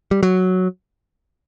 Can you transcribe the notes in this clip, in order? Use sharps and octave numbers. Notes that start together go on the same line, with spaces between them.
G3
F#3